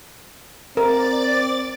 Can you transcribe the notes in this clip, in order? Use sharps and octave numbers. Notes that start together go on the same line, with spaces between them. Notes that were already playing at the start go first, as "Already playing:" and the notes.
C4 A#4 D5 D6 A6